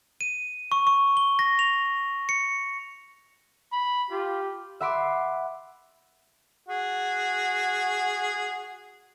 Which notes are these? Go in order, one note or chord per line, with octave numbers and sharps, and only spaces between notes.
D#7
C#6
C#6
G7
A#6
F7
C#7
B5
F4 G4
E5 F#5 B5 C6 D6
F#4 G#4